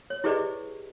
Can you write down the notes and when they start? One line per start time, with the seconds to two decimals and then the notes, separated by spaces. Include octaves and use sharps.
0.10 C#5
0.24 E4 G4 G#4 B4 D5 D#5